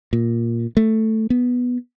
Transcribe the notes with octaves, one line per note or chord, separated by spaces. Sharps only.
A#2
A3
B3